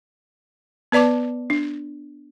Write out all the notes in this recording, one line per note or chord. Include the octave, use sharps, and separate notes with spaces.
B3 B4 D5 A5 D6
D4